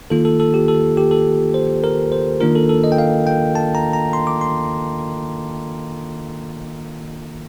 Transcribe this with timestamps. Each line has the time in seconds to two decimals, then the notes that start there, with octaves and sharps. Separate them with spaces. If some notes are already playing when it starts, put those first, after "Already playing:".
0.10 D#3 A#3 F4 A4
0.25 A4
0.40 A4
0.54 G4
0.68 A4
0.97 G4
1.11 A4
1.54 C5
1.84 A#4
2.12 C5
2.40 D#3 A#3 D4 F4 A#4
2.55 A4
2.69 A4
2.84 D#5
2.92 G5
2.98 F5
3.27 G5
3.55 A5
3.75 A#5
3.93 A#5
4.13 C6
4.27 D6
4.41 C6